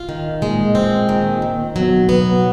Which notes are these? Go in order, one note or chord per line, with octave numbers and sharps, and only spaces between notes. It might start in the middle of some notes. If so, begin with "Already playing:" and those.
Already playing: F4
D#3
A#2 G#3
C4
D#3
D#3
B2 F#3
B3